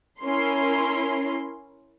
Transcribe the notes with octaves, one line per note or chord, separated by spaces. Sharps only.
C#4 E4 A#4 C6 C7